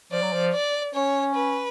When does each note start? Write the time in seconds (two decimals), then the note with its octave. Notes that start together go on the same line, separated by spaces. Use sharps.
0.12 F3 D5
0.22 F#3
0.33 F3
0.54 D5
0.95 C#4 C#5
1.35 B4